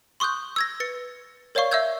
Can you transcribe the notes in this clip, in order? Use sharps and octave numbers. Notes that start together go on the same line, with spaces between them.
C6 C#6 D#6 F#6 G6
E6 G#6 A#6
B4 A6 C#7
A#4 C#5 D5 F5 C#6
E5 F5 E6 G6 G#6